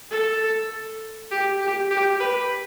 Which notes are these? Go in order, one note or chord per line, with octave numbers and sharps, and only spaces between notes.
A4
G4
G4
G4
B4